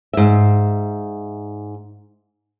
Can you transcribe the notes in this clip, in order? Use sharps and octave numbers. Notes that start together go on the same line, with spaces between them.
G#2 E5